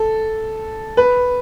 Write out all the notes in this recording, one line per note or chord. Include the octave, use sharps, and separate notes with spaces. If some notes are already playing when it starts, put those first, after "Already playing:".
Already playing: A4
B4